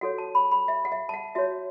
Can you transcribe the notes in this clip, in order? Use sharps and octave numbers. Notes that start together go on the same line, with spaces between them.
F#4 A4 C#5 F#5
A5
B5
B5
E5
F#5
E5
A5
F#5
F#4 C#5 E5